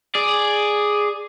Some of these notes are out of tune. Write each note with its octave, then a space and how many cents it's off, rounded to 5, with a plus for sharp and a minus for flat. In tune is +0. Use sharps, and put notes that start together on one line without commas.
G#4 +0 D5 +5